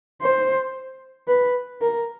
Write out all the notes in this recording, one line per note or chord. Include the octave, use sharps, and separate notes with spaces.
C5
B4
A#4